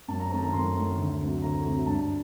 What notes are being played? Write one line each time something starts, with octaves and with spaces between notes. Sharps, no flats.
F#2 A5
A#5
D#3 A3 C4 A5
A#5
F#2 C6
D#3 A3 C4
D2
C3 F#3 A3 C4
D2 A#5
C3 F#3 A3 C4
G2 A5